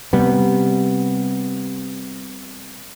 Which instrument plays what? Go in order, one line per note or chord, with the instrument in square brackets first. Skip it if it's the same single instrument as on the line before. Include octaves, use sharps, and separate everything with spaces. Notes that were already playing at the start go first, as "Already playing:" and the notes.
[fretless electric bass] C3 G3 B3